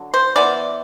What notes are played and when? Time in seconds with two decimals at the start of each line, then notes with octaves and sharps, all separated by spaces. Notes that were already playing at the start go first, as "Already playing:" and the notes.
Already playing: D3 F#3
0.14 C5
0.36 E3 B3 D5